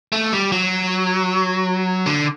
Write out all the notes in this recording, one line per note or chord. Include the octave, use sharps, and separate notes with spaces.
A3
G3
F#3
D3